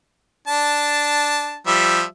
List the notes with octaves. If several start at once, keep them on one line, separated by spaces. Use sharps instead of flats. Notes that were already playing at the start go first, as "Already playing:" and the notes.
D4 A5
F3 G3 E5